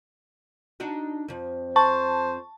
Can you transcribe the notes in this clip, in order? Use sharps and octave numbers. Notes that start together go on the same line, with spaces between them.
D4 D#4 F#4
F2 F3
C5 A5 C#6